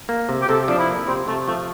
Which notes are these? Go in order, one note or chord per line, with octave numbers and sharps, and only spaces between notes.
A#3
C3
G4
C3 A4
F3 D4
E4
A#3
C3 C4
C3 A3
F3 A3